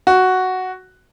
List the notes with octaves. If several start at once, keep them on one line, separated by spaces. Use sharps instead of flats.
F#4